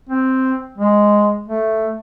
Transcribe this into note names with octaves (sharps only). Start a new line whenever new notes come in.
C4
G#3
A3